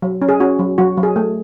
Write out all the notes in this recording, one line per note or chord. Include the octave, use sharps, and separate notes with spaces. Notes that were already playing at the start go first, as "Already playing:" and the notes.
F#3
C#4
G#4
C#4 F#4
F#3
F#3 F#4
F#3
G#4
A3